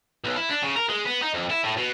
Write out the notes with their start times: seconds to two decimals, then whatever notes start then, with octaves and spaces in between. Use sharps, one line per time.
0.25 B1
0.36 E4
0.50 D4
0.63 C#3
0.76 A#4
0.89 G#3
1.06 B3
1.22 D#4
1.34 F2
1.50 E4
1.64 A2
1.77 B2